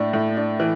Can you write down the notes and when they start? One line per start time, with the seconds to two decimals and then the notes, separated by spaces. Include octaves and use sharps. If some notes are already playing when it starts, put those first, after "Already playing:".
Already playing: A2 D4
0.13 A2
0.37 D4
0.60 E3